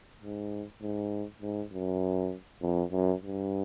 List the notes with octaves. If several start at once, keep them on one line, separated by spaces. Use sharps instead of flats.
G#2
G#2
G#2
F#2
F2
F#2
G2